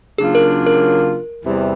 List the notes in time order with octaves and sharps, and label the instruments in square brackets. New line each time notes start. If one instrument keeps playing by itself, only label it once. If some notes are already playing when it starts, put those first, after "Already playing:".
[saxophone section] C#3 F#3 A#3 D4 F4 [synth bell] G#4
[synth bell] A#4
A#4
[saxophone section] E2 C3 E3 G3